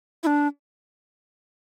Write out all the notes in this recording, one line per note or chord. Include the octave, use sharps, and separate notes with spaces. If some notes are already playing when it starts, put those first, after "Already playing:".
E4
D4